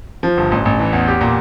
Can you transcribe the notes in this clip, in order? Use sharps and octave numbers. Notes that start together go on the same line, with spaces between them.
F3
G1
A1
A1
E3
E2
G4
A#2